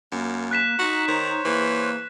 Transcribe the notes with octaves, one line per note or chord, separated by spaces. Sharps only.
F#2 A#3
F#6 B6 E7
D#4 F#4 A#5
D#3 C5 C#5
E3 A#3